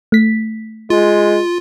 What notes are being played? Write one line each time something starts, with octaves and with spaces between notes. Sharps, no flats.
A3 B6
G#3 F4